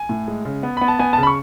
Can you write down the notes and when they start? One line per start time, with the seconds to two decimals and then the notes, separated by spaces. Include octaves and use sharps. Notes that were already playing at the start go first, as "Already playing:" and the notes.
Already playing: G#5
0.09 A2
0.28 G#3
0.45 C#3
0.63 B3
0.77 B3 B5
0.88 A5
0.99 B3 G#5
1.13 A5
1.18 C#3
1.23 B5
1.27 C#6